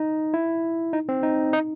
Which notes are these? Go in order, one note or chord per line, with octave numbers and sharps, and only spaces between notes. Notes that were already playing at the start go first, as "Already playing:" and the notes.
Already playing: D#4
E4
D#4
C4
D#4
D#4